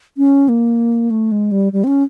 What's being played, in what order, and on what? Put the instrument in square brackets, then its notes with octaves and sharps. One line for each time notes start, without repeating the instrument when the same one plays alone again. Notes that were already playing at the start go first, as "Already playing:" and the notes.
[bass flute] C#4
A#3
A3
G#3
G3
G3
C4
C#4